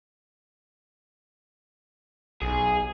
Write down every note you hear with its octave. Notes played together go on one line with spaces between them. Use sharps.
B1 G#4